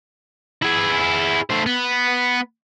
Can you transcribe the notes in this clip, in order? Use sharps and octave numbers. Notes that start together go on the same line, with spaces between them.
E4 G#4
A3 C5
B3